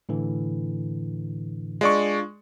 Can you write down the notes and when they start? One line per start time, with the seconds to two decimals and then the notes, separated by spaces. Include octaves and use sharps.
0.09 A2 D3 E3
1.81 G#3 D4 F4 D5 C#6